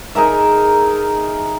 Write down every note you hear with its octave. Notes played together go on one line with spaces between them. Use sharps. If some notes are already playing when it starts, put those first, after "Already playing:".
D#4 G#4 A#4 E5